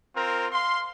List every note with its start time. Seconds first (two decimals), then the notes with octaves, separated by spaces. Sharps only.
0.16 C4 F4 A#4
0.52 F5 C6